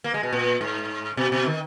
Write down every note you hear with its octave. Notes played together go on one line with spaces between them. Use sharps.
A#3
G#3
B2
A#2
G#2
B2
B2
D#3